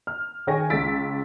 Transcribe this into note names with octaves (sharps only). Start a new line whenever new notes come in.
F6
D#3 G#4 C#5 G5 G#5 A#6
C#2 E6 A6 B6 D7